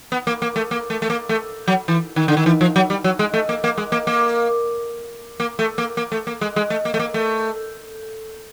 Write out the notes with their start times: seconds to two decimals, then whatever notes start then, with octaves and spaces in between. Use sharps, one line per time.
0.12 B3
0.27 A#3
0.42 A#3
0.56 A3
0.71 A#3
0.90 A3
1.02 A3
1.10 A#3
1.29 A3
1.68 F#3
1.88 E3
2.16 D#3
2.28 D3
2.37 D#3
2.46 E3
2.61 F3
2.76 F#3
2.90 G3
3.04 F#3
3.19 G#3
3.34 A3
3.49 A#3
3.64 A#3
3.78 G#3
3.92 A#3
4.07 A#3
5.40 A#3
5.59 A3
5.78 A#3
5.97 A#3
6.12 A3
6.27 A#3
6.41 G#3
6.56 G#3
6.70 A3
6.85 A#3
6.94 A3
6.99 A#3
7.14 A3